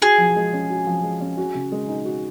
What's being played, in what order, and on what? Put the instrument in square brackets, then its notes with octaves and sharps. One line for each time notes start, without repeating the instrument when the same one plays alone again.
[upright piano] F#4 [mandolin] G#4
[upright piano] F3
G#3
C#4
F#4
F3
G#3
C#4
F#4
C#3
G#3
D#4
F#4